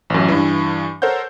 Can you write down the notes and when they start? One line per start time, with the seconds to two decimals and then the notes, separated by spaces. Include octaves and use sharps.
0.10 A1 F#2
0.28 G2 E3
1.02 A4 A#4 C5 C#5 F#5 G6